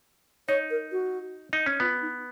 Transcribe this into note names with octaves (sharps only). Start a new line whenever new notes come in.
D#4 C#5
A#4
F#4
D#4
C#4
B3 F4
D#4